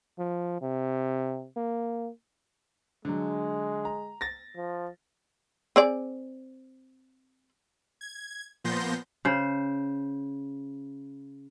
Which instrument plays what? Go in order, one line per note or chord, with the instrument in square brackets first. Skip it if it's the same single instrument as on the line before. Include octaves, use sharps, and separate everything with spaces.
[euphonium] F3
C3
A#3
[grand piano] D3 F#3 [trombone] G#3
[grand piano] A#5
A6 A#6
[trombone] F3
[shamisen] C4 G#4 D5
[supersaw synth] G#6
A#2 F3 B3 C6 G6 A#6
[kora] C#3 C5